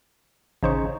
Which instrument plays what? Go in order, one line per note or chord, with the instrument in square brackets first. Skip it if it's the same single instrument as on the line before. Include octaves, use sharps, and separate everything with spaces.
[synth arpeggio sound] A1 C5 C#6 [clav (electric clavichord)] C#3 D#4